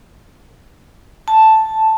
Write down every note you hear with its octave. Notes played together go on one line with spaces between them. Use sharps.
A5